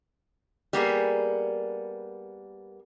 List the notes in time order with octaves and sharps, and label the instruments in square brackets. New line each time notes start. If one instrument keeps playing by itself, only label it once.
[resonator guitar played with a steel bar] G3 A#3 B3 G#4